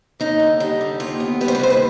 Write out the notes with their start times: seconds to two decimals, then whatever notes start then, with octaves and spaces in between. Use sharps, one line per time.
0.20 D#2 D#4
0.40 D3
0.60 G3 D#4
0.81 D3
1.00 D#2 F4
1.20 B3
1.41 G3 B4
1.48 C5
1.55 B4
1.60 D#2 C5
1.70 B4